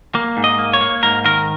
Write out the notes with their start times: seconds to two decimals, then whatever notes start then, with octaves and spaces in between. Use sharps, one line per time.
0.15 A#3
0.37 G#2
0.44 D#5
0.59 A#3
0.73 C#5
0.81 A#3
1.03 G#2 A#4
1.25 D#3 A#4